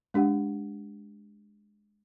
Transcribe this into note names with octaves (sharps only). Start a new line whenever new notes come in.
G#3 D4 G4 F#5